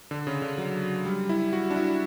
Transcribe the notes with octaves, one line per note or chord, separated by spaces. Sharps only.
D3
C#3
D3
F#3
G3
E4
F#4
D4
E4